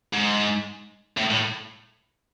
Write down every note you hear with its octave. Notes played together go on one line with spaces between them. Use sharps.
G#2
A2
A2